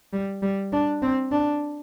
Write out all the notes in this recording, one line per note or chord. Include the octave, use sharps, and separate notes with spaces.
G3
G3
D4
C4
D4